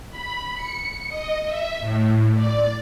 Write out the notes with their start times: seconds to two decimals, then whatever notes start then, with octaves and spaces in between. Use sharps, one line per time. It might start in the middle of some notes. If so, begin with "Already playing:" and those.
0.10 B5
0.54 C#7
1.09 D#5
1.46 E5
1.80 A2
2.35 D5